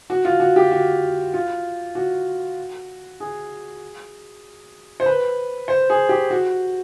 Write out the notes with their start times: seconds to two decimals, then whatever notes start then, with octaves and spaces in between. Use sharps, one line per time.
0.10 F#4
0.25 F4
0.40 F#4
0.56 G4
0.71 F#4
1.34 F4
1.95 F#4
3.20 G#4
5.00 C5
5.06 B4
5.68 C5
5.90 G#4
6.09 G4
6.30 F#4